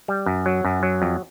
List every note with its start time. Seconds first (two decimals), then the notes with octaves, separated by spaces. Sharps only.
0.08 G3
0.26 F#2
0.46 F#3
0.65 F#2
0.83 F#3
1.02 F2